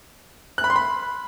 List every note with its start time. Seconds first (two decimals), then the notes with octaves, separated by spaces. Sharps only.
0.58 F#6
0.64 B5
0.70 C6
0.76 B5